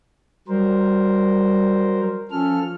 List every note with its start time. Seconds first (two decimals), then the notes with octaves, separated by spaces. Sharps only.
0.48 F#3 G3 A#4 C5
2.31 F3 C#4 A4 F6